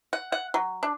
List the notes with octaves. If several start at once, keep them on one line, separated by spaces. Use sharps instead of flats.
F#5
F#5
F#3
D4